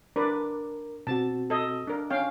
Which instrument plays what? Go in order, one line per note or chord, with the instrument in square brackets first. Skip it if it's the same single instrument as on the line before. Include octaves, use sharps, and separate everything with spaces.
[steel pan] D4 B4 D5 [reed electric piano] A#4
[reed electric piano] B2 C4 F#4 [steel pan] A5
[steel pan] A4 D#5
D4 A#4
C#4 F5 G5